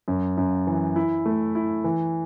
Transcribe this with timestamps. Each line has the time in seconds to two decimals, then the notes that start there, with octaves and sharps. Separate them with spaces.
0.08 F#2
0.38 F#2
0.67 E3
0.96 E4
1.26 A3
1.55 E4
1.84 E3